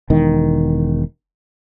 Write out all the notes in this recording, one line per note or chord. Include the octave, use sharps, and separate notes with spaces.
E1 D#3